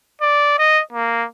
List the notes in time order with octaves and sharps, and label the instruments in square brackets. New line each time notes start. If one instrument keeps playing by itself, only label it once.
[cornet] D5
D#5
A#3